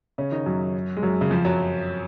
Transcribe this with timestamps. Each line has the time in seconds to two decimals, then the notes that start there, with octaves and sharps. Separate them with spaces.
0.18 C#3 C#4
0.32 D#3 D#4
0.46 F#2 F#3
0.97 G#3
1.03 F#2 F#3
1.21 C#3
1.31 F2 F3
1.45 F#2 F#3